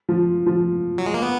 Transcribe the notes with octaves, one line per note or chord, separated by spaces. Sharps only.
F3
F3
F#3
G#3
A#3
B3